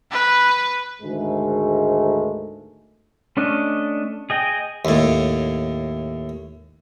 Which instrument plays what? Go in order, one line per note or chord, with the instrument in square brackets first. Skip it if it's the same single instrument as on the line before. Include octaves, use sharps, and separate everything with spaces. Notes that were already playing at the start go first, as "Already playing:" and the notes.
[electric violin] B4
[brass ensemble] D2 G#2 D#3 G#3 A3
[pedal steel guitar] A3 C#4 D4 D#5
G#4 D#5 G5
[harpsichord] D#2 A2